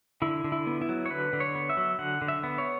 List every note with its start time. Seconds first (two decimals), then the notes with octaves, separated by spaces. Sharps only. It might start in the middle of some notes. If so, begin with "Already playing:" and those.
0.22 D3 E4
0.44 D3
0.52 E4
0.67 B3
0.82 E4
0.89 F#3
1.06 C#5
1.11 D3 B4
1.33 D3
1.40 C#5
1.55 B3
1.70 E5
1.77 F#3
1.99 D3 F#5
2.22 D3
2.28 E5
2.43 B3
2.58 C#5